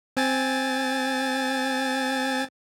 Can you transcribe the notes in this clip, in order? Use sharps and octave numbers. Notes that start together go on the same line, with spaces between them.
C4 G#5 A6